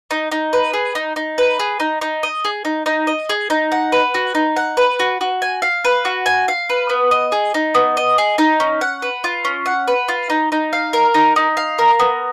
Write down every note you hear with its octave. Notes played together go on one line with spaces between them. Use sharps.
D#4
D#4
B4
G#4
D#4
D#4
B4
G#4
D#4
D#4
D#5
G#4
D#4
D#4
D#5
G#4
D#4
F#5
B4
F#4
D#4
F#5
B4
F#4
F#4
G#5
F5
B4
F#4
G#5
F5
B4
B3
D#5
G#4
D#4
B3
D#5
G#4
D#4
C#4
F#5
B4
F4
C#4
F#5
B4
F4
D#4
D#4
F5
A#4
D#4
D#4
F5
A#4
B3